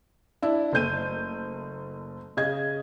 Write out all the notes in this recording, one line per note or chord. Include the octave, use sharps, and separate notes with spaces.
D4 E4
F#1 A3 G6 D#7
C#3 D#5 G#6